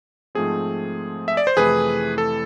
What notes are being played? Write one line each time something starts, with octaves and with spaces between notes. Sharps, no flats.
G#2 F3 A3 C4 G#4
E5
D5
C5
F2 C3 E3 A3 E4 G#4 B4
A4